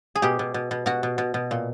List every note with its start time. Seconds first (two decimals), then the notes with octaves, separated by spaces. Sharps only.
0.15 G#4
0.22 B2 G4
0.39 B2
0.54 B2
0.71 B2
0.86 B2 F#4
1.03 B2
1.18 B2
1.34 B2
1.51 A#2